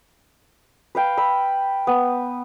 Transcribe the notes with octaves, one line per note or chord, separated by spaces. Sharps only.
B4 F5 G5
B5 E6
B3